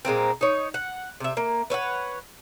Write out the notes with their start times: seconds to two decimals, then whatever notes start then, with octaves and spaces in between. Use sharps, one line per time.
0.05 A#2 G#3 A#3 C4
0.41 D#4 C#5
0.74 F#5
1.20 C3 E5
1.37 A#3
1.70 B4 C#5 E5 F#5